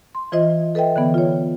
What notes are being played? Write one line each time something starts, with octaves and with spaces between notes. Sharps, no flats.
C6
E3 F4 C5 D#5
A4 B4 D#5 E5 G5
D3 E3 B3
F4 C#5